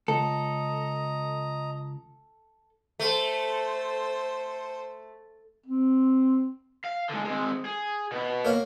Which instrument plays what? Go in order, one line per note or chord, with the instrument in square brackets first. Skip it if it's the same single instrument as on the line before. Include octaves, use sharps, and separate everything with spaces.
[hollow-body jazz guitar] C#2 [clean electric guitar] A4 [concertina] D#5 A#5
[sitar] A3 [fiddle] A4 C5
[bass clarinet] C4
[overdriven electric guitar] F5
D3 G#3
G#3 C4
G#4
B2 B3
[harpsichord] A#3 C#5 F5